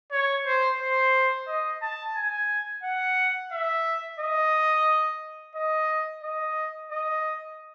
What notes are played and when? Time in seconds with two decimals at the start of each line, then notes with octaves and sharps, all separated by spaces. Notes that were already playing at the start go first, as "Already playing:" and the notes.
0.11 C#5
0.46 C5
0.80 C5
1.48 D#5
1.82 A5
2.16 G#5
2.83 F#5
3.52 E5
4.19 D#5
5.55 D#5
6.24 D#5
6.92 D#5